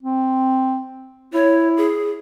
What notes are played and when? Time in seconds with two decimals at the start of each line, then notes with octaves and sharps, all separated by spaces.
0.03 C4
1.34 E4 C#5
1.77 G#4